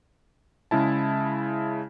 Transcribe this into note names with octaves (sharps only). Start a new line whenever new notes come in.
C#3 G#3 E4 A5